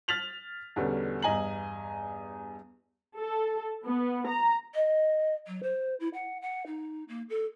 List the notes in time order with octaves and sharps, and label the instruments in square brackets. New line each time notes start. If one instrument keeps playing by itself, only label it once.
[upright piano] F6 A6 B6 F7 F#7
E2 B2 D3 G3 B3 C#4
E2 G2 D#5 G#5 A#5 F#7
[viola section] A4
B3
A#5
[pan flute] D#5
F#3
C5
E4
F#5
F#5
D#4
A#3
A4